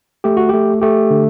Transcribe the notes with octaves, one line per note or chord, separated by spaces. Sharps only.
A3 G4
F#4
A3 G4
A3 G4
D3